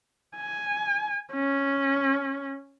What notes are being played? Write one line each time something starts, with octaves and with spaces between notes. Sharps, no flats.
G#5
C#4